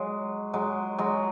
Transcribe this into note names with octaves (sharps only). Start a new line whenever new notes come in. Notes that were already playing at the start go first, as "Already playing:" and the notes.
Already playing: F#3 G#3
F#3 G#3
F#3 G#3